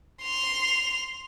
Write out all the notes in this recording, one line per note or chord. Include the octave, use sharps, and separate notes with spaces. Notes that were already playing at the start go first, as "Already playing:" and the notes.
C6 F7